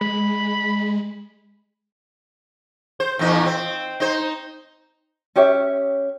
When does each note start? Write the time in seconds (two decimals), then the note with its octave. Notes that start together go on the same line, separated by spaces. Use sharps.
0.01 G#3 B5
3.00 C5
3.19 E2 A#2 D#4
3.46 C4
4.00 D#4 C5
5.36 C#4 G4 C#5 E5